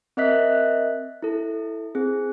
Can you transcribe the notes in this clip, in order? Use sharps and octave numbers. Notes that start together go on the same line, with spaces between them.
C4 A#4 D#5 E5 F#6 B6
E4 A4
C4 G#4